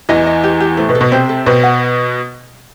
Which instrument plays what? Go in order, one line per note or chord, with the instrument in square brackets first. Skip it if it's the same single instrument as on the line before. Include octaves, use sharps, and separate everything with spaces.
[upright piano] E2 E3 [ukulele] D#5
[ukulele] D#5
G4
G4
[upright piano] A2 A3 [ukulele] C5
[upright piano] B2 B3
[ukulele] A4
[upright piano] B2 B3
[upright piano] C3 C4 [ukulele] C5
[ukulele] A4
[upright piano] B2 B3 [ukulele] C5
[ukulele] F#5